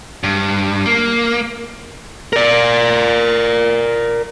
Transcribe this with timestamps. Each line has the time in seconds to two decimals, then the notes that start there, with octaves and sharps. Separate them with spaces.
0.23 G2
0.86 A#3
2.33 A#4 D5